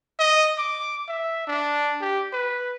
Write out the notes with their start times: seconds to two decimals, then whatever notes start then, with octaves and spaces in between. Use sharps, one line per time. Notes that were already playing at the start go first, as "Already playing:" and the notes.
0.19 D#5
0.58 D6
1.08 E5
1.47 D4
2.01 G4
2.33 B4